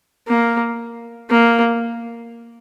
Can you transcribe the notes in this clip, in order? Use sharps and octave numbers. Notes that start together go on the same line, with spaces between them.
A#3
A#3